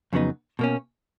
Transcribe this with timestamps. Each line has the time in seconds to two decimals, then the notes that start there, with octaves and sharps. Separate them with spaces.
0.13 F2 C#3 F#3 B3 D#4
0.59 B2 A#3 C#4